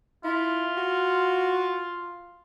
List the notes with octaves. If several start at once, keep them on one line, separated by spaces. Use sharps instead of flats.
E4 F4
F#4